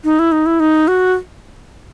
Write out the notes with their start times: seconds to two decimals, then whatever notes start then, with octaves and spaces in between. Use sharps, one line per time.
0.04 D#4
0.19 E4
0.32 D#4
0.46 E4
0.60 D#4
0.88 F#4